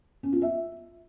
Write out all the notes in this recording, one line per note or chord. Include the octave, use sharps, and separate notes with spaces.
C#4
F4
E5